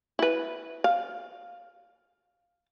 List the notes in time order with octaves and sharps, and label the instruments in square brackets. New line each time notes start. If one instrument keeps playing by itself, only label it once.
[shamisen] E4 B4
F5